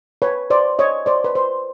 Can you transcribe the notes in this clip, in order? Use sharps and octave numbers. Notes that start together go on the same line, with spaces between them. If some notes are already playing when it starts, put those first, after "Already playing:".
B4 C#5
C5 D5
C#5 D#5
C5 D5
B4
C5